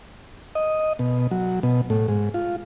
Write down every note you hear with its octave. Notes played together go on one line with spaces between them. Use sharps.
D#5
B2
F#3
B2
A2
G#2
F4